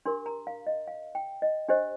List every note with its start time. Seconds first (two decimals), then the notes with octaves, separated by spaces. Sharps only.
0.06 D4 G4 A#4 C6
0.26 A#5
0.47 F5
0.67 D#5
0.87 F5
1.15 G5
1.42 D#5
1.69 D4 G4 C5 D#5